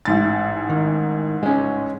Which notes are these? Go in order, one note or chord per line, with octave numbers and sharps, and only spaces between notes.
A1 G#2 A6
D#3
G#3 C#4